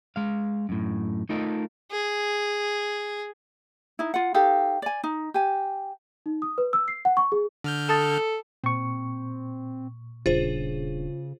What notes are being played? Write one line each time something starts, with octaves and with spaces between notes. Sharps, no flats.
G#3 F5
F#2 A2
A3 D#4 F4 A4 A#4 D#5
G#4
D#4 E4
F4 F#5
D#4 G4 A4 F5
D5 G#5
D#4
G4 G#5
D#4
D#6
B4
E6
C7
F#5
C#6
G#4
D3 F6 G6
A4 A5 D#6 A6
A#2 C4 C#6
D#1 C#3 D4 F4 G#4 C5